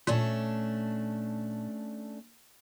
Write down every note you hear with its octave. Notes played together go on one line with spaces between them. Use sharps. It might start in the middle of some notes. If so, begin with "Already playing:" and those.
A#2 A3 C#4 D4